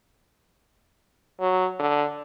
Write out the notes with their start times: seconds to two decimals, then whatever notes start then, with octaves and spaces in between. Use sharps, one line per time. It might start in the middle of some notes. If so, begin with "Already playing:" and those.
1.41 F#3
1.80 D3